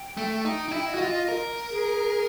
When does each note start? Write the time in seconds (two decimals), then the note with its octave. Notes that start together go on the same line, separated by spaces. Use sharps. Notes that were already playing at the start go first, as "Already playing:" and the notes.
Already playing: G5
0.17 A3
0.45 D#4 G5
0.68 D#4
0.72 E4
0.87 D#5
0.95 F#4
1.01 F4
1.29 A#4
1.70 G#4